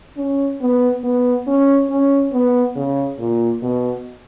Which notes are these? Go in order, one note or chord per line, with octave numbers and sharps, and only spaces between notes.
C#4
B3
B3
C#4
C#4
B3
C#3
A#2
B2